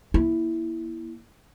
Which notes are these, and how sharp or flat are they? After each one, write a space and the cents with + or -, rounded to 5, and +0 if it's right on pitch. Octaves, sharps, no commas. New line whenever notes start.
A#3 +35 E4 +0